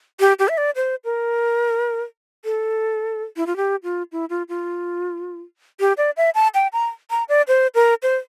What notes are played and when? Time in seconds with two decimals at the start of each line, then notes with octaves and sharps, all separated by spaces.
0.20 G4
0.39 G4
0.48 E5
0.58 D5
0.76 C5
1.05 A#4
2.45 A4
3.36 E4
3.47 F4
3.56 G4
3.83 F4
4.12 E4
4.30 F4
4.49 F4
5.80 G4
5.98 D5
6.17 E5
6.35 A5
6.55 G5
6.73 A#5
7.10 A#5
7.29 D5
7.48 C5
7.75 A#4
8.03 C5